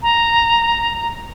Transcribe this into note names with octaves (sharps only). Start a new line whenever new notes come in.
A#5